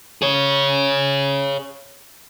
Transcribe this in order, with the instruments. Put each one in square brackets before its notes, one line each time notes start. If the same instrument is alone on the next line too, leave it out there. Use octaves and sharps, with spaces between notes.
[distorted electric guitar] G#4 C#5